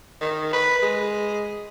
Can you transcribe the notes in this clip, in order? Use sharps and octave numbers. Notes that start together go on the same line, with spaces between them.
D#3
B4
G#3